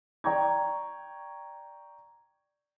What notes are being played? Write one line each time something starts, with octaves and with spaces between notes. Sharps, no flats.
D5 G5 A#5 C#6 G#6